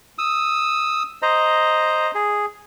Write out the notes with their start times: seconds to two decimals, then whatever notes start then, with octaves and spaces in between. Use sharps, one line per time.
0.18 D#6 E6
1.22 C5 D#5 A#5
2.15 G#4